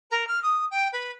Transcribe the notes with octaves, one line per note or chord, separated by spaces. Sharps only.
A#4
F6
D#6
G5
B4